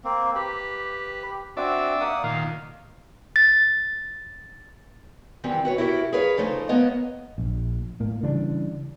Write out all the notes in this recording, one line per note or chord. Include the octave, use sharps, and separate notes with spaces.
A#3 C4
G4 B4
C4 D4 F#4 D5 E5
A#3 F#5 D#6
A#2 D#3 F5
A6
D#3 E3 G3 B3 C4
F#4 B4 C#5
E4 F#4 G4 A4 A#4
G#4 A#4 B4 C#5 F5
C#3 F3 A3 D#4 C5
G#3 A#3 B3 C#5 D#5
A#1
A2 A#3
C#3 E3 G3 D4